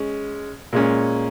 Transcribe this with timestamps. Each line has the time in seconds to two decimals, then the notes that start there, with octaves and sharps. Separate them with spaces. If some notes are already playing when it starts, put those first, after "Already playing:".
Already playing: G#3 C#4
0.73 A#2 G#3 C#4